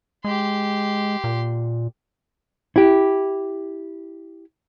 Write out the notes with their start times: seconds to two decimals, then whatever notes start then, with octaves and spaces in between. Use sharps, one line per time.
0.24 G#3 G4 C6
1.24 A#2
2.76 E4 G4